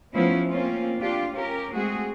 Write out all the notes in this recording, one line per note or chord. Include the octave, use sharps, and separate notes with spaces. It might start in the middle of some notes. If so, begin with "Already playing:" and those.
F3 A3 B3 C#4 E4
A#3 C4 C#4 F4
D4 F4 G4
C#4 G4 A#4
G#3 A3 C4 F#4 G#4